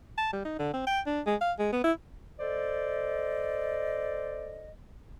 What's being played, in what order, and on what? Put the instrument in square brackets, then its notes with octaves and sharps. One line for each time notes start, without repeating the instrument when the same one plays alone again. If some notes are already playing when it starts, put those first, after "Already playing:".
[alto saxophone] A5
G3
D#4
D3
C4
G5
D4
G#3
F5
G#3
B3
E4
[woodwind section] A4 C5 D5 D#5